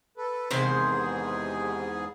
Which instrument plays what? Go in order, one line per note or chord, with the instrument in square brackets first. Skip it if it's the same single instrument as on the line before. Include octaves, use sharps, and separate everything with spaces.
[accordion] A4 B4
[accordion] E2 G#2 G#4 [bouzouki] C3 D#3 C5